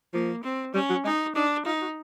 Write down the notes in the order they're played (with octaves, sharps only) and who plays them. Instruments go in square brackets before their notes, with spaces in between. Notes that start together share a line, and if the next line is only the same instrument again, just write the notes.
[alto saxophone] F3 [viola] A#3
[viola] C4
[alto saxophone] G3 [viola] C#4
[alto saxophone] F#3
[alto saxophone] G#3 [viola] D#4
[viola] D4 [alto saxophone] D#4
[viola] D#4 [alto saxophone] F4
[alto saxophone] F#4